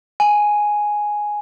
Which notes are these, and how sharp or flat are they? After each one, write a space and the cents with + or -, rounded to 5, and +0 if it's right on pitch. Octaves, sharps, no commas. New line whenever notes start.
G#5 +0